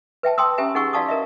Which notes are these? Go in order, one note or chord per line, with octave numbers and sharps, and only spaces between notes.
B4 E5 G5 A5
G5 A5 C6 D#6 E6
C#4 G4 E5 G#5 A#5
D#4 G#4 F#5 C#6 E6
F#4 D5 F5 A5 C#6 D#6
E4 A#4 D#5 E5